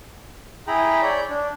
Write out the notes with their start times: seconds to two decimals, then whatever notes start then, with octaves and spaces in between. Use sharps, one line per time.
0.67 E4 G#4 G5 A#5 B5
1.02 C#5 D5 G6
1.30 D4